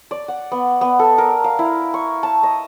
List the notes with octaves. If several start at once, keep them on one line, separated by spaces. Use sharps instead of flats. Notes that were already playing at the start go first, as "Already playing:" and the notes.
D5
F#5
B3
B3
A4
A#4
F5
E4
C#6
A5
D#5